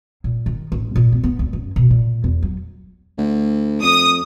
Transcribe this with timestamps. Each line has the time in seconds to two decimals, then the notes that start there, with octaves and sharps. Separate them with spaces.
0.24 A#2
0.46 D#3
0.72 A1
0.96 A#2
1.12 B3
1.23 B3
1.39 D2
1.53 F#2
1.76 B2
1.91 A#2
2.24 E2
2.42 F#3
3.18 D2
3.83 F2 D#6